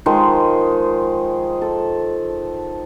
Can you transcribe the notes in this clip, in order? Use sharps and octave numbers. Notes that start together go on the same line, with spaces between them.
D#3 F3 G#3
A4